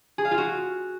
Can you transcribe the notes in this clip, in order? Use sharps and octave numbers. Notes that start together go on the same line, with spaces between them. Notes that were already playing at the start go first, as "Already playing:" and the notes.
G#4
F5
F4
F#4